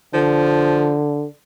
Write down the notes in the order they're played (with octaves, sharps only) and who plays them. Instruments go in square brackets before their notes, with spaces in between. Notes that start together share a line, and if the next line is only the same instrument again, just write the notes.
[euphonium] D3 [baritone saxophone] F3